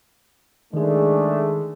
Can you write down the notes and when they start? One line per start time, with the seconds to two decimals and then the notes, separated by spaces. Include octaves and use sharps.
0.74 D#3 G#3 A3 D4 G#4